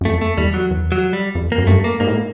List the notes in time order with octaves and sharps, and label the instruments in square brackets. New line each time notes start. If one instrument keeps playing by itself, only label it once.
[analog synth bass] F#2
[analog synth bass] F2 [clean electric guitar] A3
[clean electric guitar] A3
[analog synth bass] E2 [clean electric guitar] G3
[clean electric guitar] F#3
[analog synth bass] E2
[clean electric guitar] F#3
G3
[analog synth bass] F2
[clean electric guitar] A#3
[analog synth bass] F#2
[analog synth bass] G2 [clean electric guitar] A3
[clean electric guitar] A#3
[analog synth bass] G#2 [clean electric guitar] A#3
[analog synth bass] A2